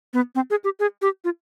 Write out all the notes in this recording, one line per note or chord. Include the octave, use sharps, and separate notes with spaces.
B3
C4
G#4
G4
G#4
G4
F4